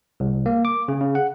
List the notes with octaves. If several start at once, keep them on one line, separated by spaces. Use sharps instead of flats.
C2
A#3
D6
C#3
C#3
F#5